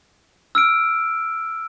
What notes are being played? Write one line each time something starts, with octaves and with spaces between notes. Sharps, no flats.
E6 F6 D7